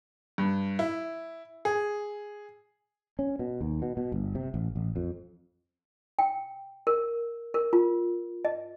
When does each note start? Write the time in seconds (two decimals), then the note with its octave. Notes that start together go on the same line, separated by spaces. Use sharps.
0.38 G2
0.79 E4
1.65 G#4
3.19 C#4
3.39 B2
3.61 D#2
3.82 B2
3.97 B2
4.12 G1
4.35 C3
4.54 A1
4.76 A1
4.96 F2
6.19 G5
6.87 A#4
7.54 A#4
7.73 F4
8.45 D#5